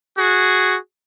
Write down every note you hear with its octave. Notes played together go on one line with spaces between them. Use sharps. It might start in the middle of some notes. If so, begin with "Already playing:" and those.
F#4 G#4